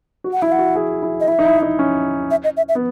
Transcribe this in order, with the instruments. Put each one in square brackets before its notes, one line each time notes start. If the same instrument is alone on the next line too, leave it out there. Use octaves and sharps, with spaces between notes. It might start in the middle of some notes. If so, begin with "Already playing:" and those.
[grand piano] F#4
[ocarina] F#5
[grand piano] E4 [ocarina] E5
[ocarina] F#5
[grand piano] F#4
G#4
E4
[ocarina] D#5
[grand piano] E4 [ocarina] E5
[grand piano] D#4
E4
D#4
C#4
[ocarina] E5
D#5
E5
E5
[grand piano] B3